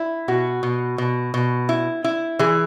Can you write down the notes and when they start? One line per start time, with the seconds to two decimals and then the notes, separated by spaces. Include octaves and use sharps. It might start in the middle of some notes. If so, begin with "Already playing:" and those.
Already playing: E4
0.28 B2 F#4
0.63 B2
0.98 B2
1.34 B2
1.69 E4
2.04 E4
2.39 E3 G#4